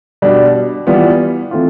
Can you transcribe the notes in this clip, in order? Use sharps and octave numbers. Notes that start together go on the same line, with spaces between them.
B2 G3 D4
E3 G3 B3 F4
E3 A3 C4 F4